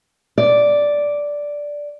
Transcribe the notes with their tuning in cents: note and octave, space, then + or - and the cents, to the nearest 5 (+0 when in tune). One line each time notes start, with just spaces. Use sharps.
D5 -5